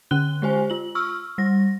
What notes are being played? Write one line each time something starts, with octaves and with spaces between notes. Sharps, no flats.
D3 C#4 F#6 G7
G#3 G4 C5 G#5
F4 F#7
C#6 E6 F6
G3 A#6